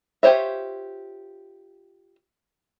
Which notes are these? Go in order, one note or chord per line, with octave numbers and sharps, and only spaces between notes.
F4 G4 C5 C#5 E5